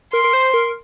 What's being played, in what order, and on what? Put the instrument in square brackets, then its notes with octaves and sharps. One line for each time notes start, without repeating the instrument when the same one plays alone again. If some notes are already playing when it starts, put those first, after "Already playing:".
[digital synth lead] A#4 [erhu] C6
[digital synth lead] A#4
C5
A#4